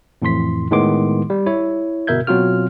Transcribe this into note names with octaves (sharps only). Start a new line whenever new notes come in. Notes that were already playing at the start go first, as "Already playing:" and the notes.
F2 A2 E3 C6 B6
A2 D#3 G#3 B3 C6 D6
G3
E4 C#5
G1 B2 A#4 E5 G6 G#6
B2 F#3 C4 F4 F#4 F6